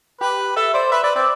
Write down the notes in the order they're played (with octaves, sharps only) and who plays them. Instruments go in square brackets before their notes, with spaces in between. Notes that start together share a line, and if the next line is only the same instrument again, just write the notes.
[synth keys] G4 [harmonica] B4
[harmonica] A4 [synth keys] E5
[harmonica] C5 [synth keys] D5
[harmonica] B4 [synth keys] E5
[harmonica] B4 [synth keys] D5
[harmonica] C4 [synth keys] D5